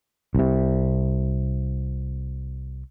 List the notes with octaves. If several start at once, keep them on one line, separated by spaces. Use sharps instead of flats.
C2 C3